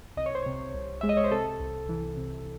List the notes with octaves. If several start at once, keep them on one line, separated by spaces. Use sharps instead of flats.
C2 D#5
C#5
C5
C3 C#5
C2
G#3 E5
D#5
C#5
C5
C3 A4
C2
E3
C3